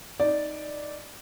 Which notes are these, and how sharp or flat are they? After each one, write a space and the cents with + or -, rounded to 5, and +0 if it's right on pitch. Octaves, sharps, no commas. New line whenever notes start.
D#4 +0 D5 +0